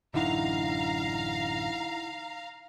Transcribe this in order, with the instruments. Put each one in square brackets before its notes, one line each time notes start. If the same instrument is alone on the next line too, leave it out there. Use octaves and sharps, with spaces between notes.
[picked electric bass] A1 F#2 D3 [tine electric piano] D#4 E4 F#5 [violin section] F5 A#5